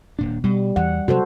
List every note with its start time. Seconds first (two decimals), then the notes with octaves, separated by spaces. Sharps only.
0.19 D#1 A#2 D4
0.44 B2 G3
0.76 E2 E3 F#5
1.08 C3 F#3 F#4 A4 C5